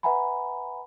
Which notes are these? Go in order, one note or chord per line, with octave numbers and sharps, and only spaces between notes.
B4 E5 F#5 G#5 A#5 B5